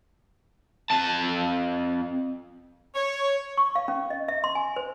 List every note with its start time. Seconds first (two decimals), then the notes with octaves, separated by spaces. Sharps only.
0.91 F2 A5
2.95 C#5
3.57 C#6
3.76 F5
3.88 C#4
4.10 D#5
4.28 E5
4.44 C6
4.55 G#5
4.76 C5